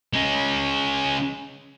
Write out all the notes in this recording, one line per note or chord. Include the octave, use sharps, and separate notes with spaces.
G#3 C#4